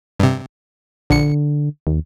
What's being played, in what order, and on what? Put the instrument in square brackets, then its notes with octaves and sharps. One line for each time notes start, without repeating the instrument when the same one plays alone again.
[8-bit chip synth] G2 C3
[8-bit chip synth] A#1 C#7 [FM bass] D3
[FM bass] D#2